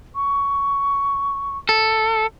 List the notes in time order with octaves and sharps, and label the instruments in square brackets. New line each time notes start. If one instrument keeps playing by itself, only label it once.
[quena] C#6
[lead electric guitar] A4